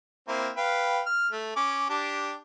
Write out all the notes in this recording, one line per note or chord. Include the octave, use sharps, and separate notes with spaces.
A#3 C4 E4
B4 F5 G5
F6
A3
C#4 D6
D4 G4 A5